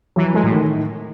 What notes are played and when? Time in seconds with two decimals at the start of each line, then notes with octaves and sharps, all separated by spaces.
0.16 E3 F#3
0.34 G#3 A3
0.44 A2
0.53 D#3